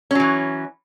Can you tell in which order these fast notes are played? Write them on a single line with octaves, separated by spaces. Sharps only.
C#4 F#3 E3